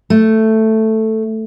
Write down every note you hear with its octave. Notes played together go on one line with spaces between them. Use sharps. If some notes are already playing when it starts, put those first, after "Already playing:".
A3